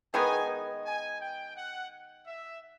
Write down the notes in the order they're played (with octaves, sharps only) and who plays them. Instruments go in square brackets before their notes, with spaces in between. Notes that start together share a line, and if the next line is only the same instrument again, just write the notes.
[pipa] D#3 G#3 B3 D#4 [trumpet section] G#5
[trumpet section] G#5
G5
F#5
E5